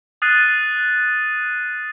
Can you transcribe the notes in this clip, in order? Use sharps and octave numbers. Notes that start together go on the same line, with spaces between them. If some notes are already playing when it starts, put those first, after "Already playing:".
D#6 F6 F#6 A6 C7 D#7